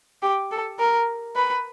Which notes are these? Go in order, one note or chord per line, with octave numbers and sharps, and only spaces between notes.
G4
A4
A#4
B4